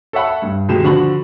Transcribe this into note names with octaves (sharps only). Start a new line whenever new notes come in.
A4 C#5 E5 F#5 B5
G2
B2 D#3 G#3 G4 E7
D3 F3 F#4 B5 F#7